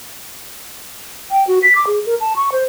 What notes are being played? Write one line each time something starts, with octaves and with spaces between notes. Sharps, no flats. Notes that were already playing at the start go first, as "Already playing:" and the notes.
G5
F#4
B6
D6
G#4
A#4
A5
C#6
C5